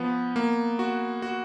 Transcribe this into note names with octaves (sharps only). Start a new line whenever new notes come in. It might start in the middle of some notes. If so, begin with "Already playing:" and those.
Already playing: F3 B3
A#3
F#4
F#4